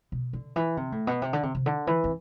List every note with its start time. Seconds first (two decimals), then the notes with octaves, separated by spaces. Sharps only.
0.12 B2
0.33 D3
0.56 E3
0.77 C3
0.92 A2
1.07 B2
1.22 C3
1.33 D3
1.43 C3
1.55 C3
1.66 D3
1.87 E3
2.04 C4